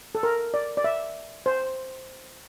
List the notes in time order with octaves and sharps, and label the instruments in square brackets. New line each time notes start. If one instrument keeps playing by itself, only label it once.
[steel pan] A4
A#4
D5
D5
E5
C5